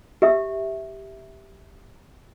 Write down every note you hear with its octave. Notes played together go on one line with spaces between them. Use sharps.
G4 E5